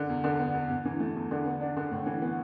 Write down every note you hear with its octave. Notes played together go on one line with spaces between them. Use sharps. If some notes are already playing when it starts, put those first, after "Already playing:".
Already playing: D3
E2
D3
B3
E2
E2
E3
A3
E2
D3
B3
D4
D3
A2
E3
B3